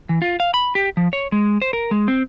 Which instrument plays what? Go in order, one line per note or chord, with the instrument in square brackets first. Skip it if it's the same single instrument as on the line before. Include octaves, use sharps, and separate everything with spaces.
[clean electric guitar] E3
F4
F5
B5
G4
F3
C#5
G#3
C5
A#4
G#3
C4